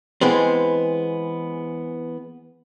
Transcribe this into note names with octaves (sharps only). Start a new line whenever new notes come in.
E3 G#3 B3 C4